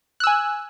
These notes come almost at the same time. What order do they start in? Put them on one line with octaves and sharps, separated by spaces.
F#6 E6 G#5